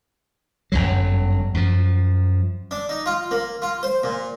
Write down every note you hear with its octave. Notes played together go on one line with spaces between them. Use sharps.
G1 C2 F#2 F#3
F#2 F3
D4
D#4
F4
A#3
F4
C5
A#2